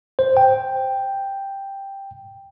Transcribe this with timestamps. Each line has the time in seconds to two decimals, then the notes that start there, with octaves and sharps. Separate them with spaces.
0.19 C5
0.37 G5